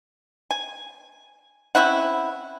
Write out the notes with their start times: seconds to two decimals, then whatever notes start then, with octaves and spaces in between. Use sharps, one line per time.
0.51 G#5
1.75 C4 C#4 E4 F#5